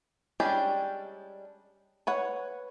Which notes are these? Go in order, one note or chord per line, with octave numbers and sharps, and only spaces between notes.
G3 G#3 C#4 D4 G4
B4 C#5 F#5